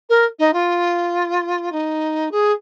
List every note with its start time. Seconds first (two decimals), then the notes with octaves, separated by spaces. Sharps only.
0.09 A#4
0.38 D#4
0.53 F4
1.72 D#4
2.31 G#4